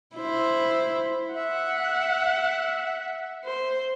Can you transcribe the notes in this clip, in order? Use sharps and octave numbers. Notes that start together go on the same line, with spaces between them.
E4 C5
E5 F#5
C5